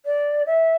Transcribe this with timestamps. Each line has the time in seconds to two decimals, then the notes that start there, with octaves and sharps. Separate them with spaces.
0.05 D5
0.46 E5